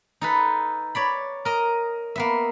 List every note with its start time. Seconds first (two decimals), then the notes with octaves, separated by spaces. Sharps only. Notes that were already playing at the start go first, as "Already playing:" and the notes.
0.21 D#4 A4 B4
0.95 C#5 D5 B5
1.45 A#4 D#5
2.16 A#3 B3 E5